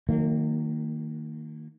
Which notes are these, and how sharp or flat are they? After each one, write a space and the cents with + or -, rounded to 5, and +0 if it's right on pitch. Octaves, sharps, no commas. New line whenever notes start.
D#3 +0 F#3 -25 A#3 -30